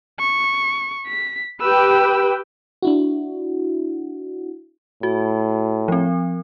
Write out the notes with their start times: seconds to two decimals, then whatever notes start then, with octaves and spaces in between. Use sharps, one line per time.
0.19 C#6
1.07 B6
1.61 G4 B4 G5 E6
2.82 D4 E4 F#4
5.03 A2 F#4
5.88 F3 C4